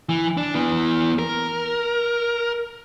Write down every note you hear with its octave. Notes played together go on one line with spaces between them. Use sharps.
E3
D4
E3 B3
A#4